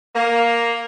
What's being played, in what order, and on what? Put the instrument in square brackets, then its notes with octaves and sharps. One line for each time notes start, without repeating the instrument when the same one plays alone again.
[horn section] A#3